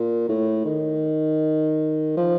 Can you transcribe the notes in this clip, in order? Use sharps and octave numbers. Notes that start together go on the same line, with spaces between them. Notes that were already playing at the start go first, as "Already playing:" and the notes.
Already playing: A#2
A2
D#3
F3